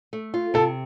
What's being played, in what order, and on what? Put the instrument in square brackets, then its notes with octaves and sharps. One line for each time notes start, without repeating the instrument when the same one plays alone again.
[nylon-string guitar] A3
F4
[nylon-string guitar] C3 [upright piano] A4